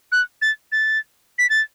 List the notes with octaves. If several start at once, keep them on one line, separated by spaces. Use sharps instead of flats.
F#6
A6
A6
B6
A6